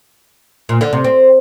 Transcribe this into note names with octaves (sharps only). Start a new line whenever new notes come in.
A#2
D3
C3
C4